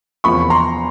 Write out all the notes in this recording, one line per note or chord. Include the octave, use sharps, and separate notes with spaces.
E2 C3 F3 A#3 B5 C#6
A#5 C6